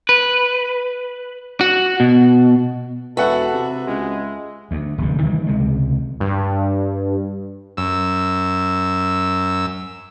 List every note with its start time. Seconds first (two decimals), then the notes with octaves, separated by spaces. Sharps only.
0.09 B4
1.61 F#4
2.00 B2
3.17 E1 F#4 A4 B4 E5 F#5
3.53 C3
3.87 C#2 G#3
4.71 D2
4.98 F1 D2 G2
5.23 D#3 E3 G3
5.47 C#2 C3 G#3
6.20 G2
7.77 F#2 E6